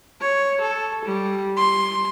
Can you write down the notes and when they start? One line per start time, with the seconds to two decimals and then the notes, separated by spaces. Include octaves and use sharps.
0.21 C#5
0.61 A4
1.05 G3
1.57 C6